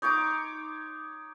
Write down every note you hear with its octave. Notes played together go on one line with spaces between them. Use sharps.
D#4 C#5 C6 D6